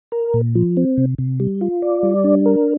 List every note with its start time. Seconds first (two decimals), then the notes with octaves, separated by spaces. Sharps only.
0.12 A#4
0.34 A#2
0.55 F3
0.77 C4
0.98 C3
1.19 C3
1.40 G3
1.61 F4
1.82 D5
2.03 G3
2.24 D4
2.46 A#4